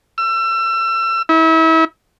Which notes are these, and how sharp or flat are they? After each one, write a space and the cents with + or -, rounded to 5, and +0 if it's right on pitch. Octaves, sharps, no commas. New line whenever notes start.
E6 +30
E4 -35